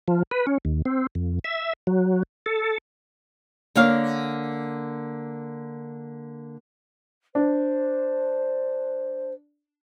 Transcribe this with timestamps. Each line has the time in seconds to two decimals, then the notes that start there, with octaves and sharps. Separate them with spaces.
0.08 F3
0.31 B4
0.47 C#4
0.65 D#2
0.85 C4
1.15 F2
1.44 E5
1.87 F#3
2.46 A4
3.75 D3 A#3 C#5 F5
7.35 D4 C5